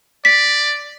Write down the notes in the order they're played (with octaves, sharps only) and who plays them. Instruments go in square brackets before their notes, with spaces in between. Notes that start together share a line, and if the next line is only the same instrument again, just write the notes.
[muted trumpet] D5 [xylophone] B6